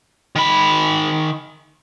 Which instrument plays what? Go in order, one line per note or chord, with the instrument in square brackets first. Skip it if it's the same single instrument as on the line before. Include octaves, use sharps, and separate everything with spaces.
[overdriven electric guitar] D#3 B5